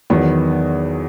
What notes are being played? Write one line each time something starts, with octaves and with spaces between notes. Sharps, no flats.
E2 D#3 F#3 B3